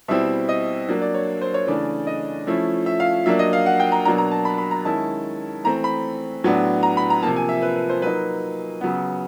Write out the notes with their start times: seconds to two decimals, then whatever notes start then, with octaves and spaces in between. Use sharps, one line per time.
0.08 B2 G3 C4 E4 E5
0.49 D#5
0.88 F#3 A#3 D4
1.02 D5
1.14 C#5
1.41 C5
1.54 C#5
1.67 C#3 E3 A3 D4 D5
2.07 D#5
2.47 F3 A3 C#4 E4
2.86 E5
3.00 F5
3.26 F#3 A#3 D4 E5
3.39 D#5
3.53 F5
3.66 F#5
3.80 G5
3.92 A#5
4.05 B2 F#3 A#3 D4 A#5
4.18 A#5
4.31 A5
4.45 B5
4.58 B5
4.71 A#5
4.85 D#3 G#3 C#4 E4 A5
5.64 E3 A3 C4 A#5
5.84 B5
6.44 A2 F#3 B3 D4
6.83 A#5
6.97 B5
7.10 A#5
7.22 C3 F3 A#3 A5
7.36 G#5
7.49 E5
7.62 B4
7.76 B4
7.89 C5
8.02 F#3 A#3 D#4 B4
8.81 C#3 F#3 B3